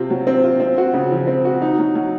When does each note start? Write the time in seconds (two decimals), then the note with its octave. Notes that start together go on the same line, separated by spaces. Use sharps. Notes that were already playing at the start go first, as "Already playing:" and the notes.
Already playing: C3 C4 F4
0.10 F#3
0.27 C4
0.44 F4
0.60 C4
0.78 F#4
0.94 C#3
1.11 F3
1.27 C4
1.45 F#4
1.62 D#4
1.78 F#3
1.95 F#3